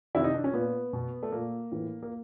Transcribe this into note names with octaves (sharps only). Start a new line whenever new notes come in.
C3 D#3 E4
D#4
D4
C#4
A#2 B3
B2
A3
A#2 A#3
A2 E3
A#3